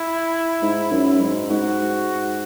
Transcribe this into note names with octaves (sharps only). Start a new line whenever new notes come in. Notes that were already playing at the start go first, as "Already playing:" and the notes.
Already playing: E4
G#2
F#2
G#2
G#2 F#4